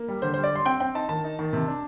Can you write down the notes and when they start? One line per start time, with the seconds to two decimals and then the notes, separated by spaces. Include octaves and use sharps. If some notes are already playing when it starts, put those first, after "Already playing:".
Already playing: A#3
0.08 G3
0.22 D3 C5
0.34 G3 C5
0.44 D5
0.52 G3 C6
0.65 C4 G5
0.80 C4 G5
0.95 D#4 A5
1.09 D#3 A5
1.24 D#4
1.39 D#3
1.53 C3
1.68 D4